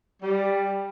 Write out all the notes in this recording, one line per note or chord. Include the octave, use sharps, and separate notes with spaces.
G3